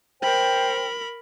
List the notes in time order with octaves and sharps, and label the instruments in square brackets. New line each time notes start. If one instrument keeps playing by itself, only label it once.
[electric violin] A#4 B5 [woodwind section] C5 G5